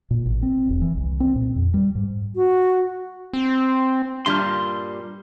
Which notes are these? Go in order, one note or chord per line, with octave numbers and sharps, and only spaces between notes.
A#2
A1
C4
E1
E3
C2
C4
A#2
F2
G3
G#2
F#4
C4
G2 A#2 G3 C6 F6